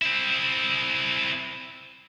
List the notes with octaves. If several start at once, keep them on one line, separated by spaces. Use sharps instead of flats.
C4 E4